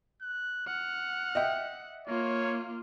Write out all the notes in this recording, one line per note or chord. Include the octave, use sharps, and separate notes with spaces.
F#6
F#5 F6
D#5 E5 G5
A#3 F4 C#5